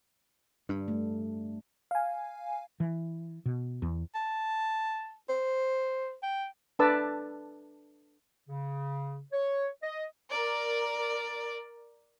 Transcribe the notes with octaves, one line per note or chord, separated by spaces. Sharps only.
G2 D4
A3
F5 G#5
E3
B2
E2
A5
C5
G5
D4 A4 B4 D5 A5 E6
C#3
C#5
D#5
A#4 D5